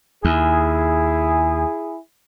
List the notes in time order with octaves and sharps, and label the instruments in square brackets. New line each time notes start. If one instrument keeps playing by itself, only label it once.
[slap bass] D#2 [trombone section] E4 G#4